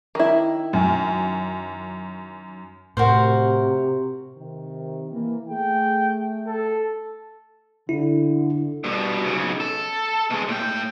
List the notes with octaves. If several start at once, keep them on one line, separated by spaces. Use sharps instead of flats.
D#3 E4
F#2
A2 C3 F#4 A#4 C5
C3 D#3
E3 A#3
A3 G#4 G5
A4
D3 E4
G2 B2
B1 C#3
A4
B2 G#3
A2 G5